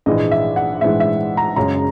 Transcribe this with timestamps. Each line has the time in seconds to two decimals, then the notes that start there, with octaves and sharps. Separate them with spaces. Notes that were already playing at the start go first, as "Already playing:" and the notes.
0.06 A#1 G#2 E3 G#3 D#5
0.31 E5
0.56 F#5
0.81 A#1 G#2 E3 G#3 E5
1.00 E5
1.37 A#5
1.56 F#1 F#2 C#3 G#3 A#5